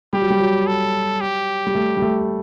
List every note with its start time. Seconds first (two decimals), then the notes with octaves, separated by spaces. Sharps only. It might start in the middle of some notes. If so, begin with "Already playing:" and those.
0.13 G3 G4
0.22 F#3
0.30 G3
0.40 F#3
0.67 A4
1.21 G4
1.67 G3
1.75 A3
1.97 G3
2.02 A3